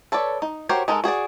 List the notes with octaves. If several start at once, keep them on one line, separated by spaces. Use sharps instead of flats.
A4 B4 C#5 D5
D#4
F#4 G4 A#4 C5 C#5
G#3 D#4 A4 A#4
F#4 G#4 C#5 D5